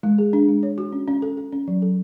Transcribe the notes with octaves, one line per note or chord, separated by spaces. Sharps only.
G#3
G#4
D4
G#3
C#5
F#4
C#4
C#4
A4
A4
C#4
F#3
A4